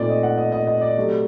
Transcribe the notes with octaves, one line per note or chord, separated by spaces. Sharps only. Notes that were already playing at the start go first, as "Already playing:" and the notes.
Already playing: A#2 A3 C4 D#4 D5
D#5
F#5
D#5
D#5
D#5
D5
C3 F#3 A3